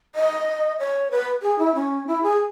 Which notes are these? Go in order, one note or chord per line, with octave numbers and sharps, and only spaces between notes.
D#5
C#5
B4
G#4
E4
C#4
E4
G#4